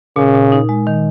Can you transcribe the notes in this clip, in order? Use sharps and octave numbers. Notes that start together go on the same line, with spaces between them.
A#2 C#3
A#2
D#4
G#3
D#3